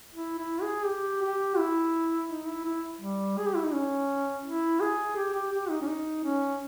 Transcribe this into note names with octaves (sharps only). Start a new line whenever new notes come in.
E4
E4
G#4
G4
G4
E4
D#4
E4
E4
G3
G#4
G4
E4
D#4
C#4
E4
G#4
G4
G4
G4
D#4
C#4
D#4
C#4